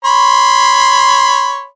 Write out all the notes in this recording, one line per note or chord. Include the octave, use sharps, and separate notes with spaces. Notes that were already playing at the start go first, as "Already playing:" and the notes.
C#5 B5 C6